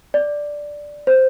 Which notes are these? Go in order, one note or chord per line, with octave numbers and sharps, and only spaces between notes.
D5
C5